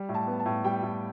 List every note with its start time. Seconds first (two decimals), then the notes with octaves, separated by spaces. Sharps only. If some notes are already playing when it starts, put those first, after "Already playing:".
Already playing: G3
0.09 A2
0.14 A5
0.27 B3
0.39 A5
0.45 A2
0.64 G3 G5
0.83 A2